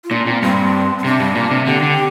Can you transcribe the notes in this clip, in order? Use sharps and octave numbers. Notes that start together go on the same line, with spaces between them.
F4
A#2 D4
A#2 C4
G2 C4
C4
C3 D4
G2
A#2
C3
D3 G4
D3